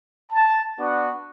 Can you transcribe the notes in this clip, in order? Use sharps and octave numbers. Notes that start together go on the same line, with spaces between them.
A5
B3 D4 F#4